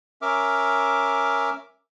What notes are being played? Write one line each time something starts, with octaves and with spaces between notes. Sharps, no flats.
C#4 A#4 E5 D6 F6